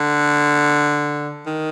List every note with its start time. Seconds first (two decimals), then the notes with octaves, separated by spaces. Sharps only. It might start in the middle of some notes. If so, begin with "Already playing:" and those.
Already playing: D3
1.46 D#3